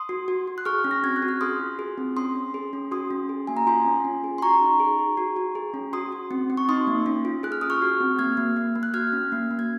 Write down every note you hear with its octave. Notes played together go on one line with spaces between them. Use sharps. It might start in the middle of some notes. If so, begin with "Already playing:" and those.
Already playing: C6 D#6
F#4
F#4
F#4
F#6
G#4 C#6 F6
C#4
A#6
C4 G#6
F#6
F#4
F6
G#4 C6 D#6
F4
G#4
C4
C#4 C6 D#6
C#4
G#4
C#4
F#4 C6 D#6
C#4
G#4
A#3 G#5
A#5
F4 G#5 C6
C#4
C#4
G#4
C6
F#4 A#5 C#6
D#4
G#4
G#4
F#4
F#4
G#4
C#4
F#4 C6 D#6
F#4
C4
C4
C#6
D#4 C6 D#6
A#3
C#4
F4
G#4 F#6
F6
G#4 D#6
C#6 F6
F#4
C4
A#3 F6 G#6
A#3
A#3
A#3
F#6
F#4 F6 G#6
C#4
A#3
A#3
G#6